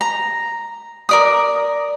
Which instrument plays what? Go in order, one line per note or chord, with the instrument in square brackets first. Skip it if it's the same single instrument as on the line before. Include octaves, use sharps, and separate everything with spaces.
[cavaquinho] A#5
A#4 D5 D#6